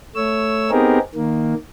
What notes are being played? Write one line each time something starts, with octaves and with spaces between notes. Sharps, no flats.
A3 C#5 E6
B3 C4 D#4 G4 G#4 A#4
D#3 A#3